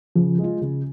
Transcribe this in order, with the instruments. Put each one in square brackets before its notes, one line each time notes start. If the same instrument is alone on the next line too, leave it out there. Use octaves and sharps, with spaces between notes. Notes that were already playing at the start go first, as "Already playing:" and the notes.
[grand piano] C#3 [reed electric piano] F3
[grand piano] G#3 F4
C#3